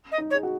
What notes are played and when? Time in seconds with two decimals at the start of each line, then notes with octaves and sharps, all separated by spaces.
0.11 D#5
0.18 D#4
0.30 C#5
0.34 G#4
0.43 F#4